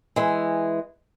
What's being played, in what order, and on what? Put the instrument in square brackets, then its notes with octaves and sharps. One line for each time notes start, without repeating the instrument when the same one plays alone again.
[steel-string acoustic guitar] E3 G#3